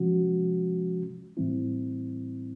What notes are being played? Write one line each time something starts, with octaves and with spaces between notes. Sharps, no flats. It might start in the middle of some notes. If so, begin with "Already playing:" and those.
Already playing: C3 F3 G#3 C#4 F#4
A2 E3 G3 C4 E4